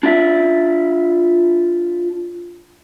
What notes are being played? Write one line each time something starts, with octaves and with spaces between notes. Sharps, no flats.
D4 F4 D5 E5